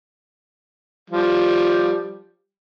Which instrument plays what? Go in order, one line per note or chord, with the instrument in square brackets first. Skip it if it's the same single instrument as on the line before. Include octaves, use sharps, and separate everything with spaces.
[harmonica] F3 G3